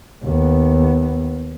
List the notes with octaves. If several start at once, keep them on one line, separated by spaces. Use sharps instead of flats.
D#2 B3